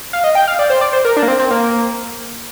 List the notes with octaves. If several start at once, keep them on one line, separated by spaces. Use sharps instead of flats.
F5
D#5
G5
F5
D5
C5
D5
C5
A#4
D4
A#3
C4
C4
A#3